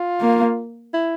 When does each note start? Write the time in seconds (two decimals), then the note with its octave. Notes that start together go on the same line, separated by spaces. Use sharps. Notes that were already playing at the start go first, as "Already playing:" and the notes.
Already playing: F4
0.20 A#3
0.94 E4